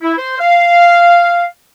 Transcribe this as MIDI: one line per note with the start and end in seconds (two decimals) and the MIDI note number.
0.02 0.13 64
0.18 0.36 72
0.39 1.45 77